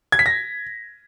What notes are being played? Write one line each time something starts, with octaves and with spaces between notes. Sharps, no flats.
G#6
B6
A#6